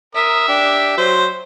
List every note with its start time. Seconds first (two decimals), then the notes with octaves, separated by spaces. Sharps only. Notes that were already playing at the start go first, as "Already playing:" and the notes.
0.15 A#4 E5 D#6
0.48 D4 G4
0.97 F#3 C5